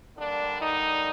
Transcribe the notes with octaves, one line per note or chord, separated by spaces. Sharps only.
D3 G3 A#3 D4
D#4